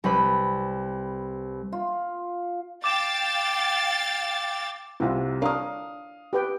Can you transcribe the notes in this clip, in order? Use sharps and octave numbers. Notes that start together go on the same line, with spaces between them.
C2 G3 B4 B5
F4
F5 G5 D6 A6 E7
C2 C3 E4 F4
D4 A#4 C#5 F5 D#6
G4 B4 G5